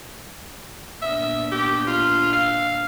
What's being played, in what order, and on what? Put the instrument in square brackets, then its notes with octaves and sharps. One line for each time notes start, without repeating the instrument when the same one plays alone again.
[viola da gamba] A#2 B3 D4 [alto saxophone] E5
[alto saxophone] G4
F4
F5